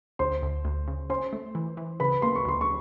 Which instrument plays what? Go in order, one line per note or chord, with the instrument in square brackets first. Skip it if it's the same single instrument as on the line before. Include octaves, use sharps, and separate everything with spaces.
[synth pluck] D2 [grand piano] C5 C6
[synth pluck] D2
D2
C#3
[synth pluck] C#4 [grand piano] C5 C6
[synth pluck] A3
E3
E3
[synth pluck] C#3 [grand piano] B4 B5
[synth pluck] A#3 [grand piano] C6
[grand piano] C#6
[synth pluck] D2 [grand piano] C6
[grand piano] C#6